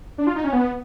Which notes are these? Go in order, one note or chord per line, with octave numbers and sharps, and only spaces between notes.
D4
F4
D#4
C#4
B3